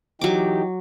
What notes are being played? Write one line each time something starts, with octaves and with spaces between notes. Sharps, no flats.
E3 F#3 D#4 G4 D6